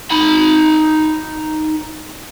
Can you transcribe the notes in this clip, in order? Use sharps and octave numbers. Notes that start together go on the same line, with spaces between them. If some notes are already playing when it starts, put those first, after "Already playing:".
D#4 B5